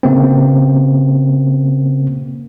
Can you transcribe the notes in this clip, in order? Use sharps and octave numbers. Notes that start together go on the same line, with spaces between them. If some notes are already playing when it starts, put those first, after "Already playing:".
C#3 A#3 C4